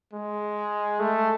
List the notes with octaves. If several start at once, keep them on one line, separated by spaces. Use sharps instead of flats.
G#3
A3